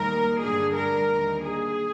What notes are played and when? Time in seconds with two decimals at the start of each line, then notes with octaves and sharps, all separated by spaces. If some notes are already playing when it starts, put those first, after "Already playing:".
Already playing: D#2 D#3 G3 A#3 A#4
0.40 G2 D3 G3 D4 G#4
0.75 A#4
1.10 D#2 D3 G3
1.44 G#4